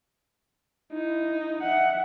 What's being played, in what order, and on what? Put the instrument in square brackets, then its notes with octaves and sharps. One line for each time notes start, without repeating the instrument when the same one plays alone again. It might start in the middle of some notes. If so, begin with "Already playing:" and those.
[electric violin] D#4 [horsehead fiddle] E4
[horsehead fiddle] E5 F#5